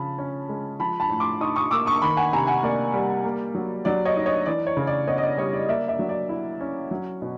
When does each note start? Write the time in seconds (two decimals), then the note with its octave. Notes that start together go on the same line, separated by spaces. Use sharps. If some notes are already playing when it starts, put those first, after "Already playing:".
Already playing: C#3 F3 A5 B5
0.18 C#4
0.49 G#3
0.80 F3 A5 B5
1.00 A5 B5
1.10 A2
1.20 C6 D6
1.40 D#4 C#6 D#6
1.56 C#6 D#6
1.71 A#3 D6 E6
1.86 C#6 D#6
2.02 D#3 B5 C#6
2.17 F#5 G#5
2.33 C3 G#5 A#5
2.47 F#5 G#5
2.63 A#3 D5
2.94 G3
3.24 A#3
3.55 F#3
3.85 F#3 D5
4.05 C#5 D#5
4.16 D#4
4.26 C#5 D#5
4.46 E3 D5
4.67 C#5
4.77 C#3
4.87 D5
5.07 B3 C#5 D#5
5.18 D#5
5.23 D5
5.38 G3 C#5
5.53 D5
5.69 A#3 D5 E5
5.88 D5 E5
5.99 F#3
6.09 D5
6.29 E4
6.61 C#4
6.91 F#3
7.22 B2